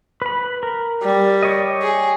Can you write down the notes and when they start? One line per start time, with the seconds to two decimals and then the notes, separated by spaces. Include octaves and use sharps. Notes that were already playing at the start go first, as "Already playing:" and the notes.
0.22 B4 B5
0.63 A#4
1.03 G3
1.43 G4 C#5 D#5
1.82 G#4